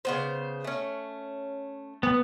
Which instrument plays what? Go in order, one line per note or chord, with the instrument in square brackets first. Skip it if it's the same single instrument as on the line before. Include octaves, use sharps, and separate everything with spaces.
[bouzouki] C#3 B3 C5
A3 C#4
[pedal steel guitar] B3